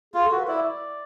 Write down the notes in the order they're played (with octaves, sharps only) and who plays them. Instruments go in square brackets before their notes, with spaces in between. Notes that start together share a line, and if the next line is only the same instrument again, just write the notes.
[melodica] F4 [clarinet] G#4
[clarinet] A4
[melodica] F#4
[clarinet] B4
[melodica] E4 [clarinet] D5